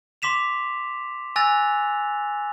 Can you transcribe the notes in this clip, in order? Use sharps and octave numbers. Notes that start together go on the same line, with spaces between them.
C6 D6 B6 E7 F7
G#5 E6 F#6 A6 A#6 F7